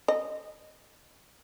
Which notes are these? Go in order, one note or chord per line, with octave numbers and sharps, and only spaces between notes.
D#5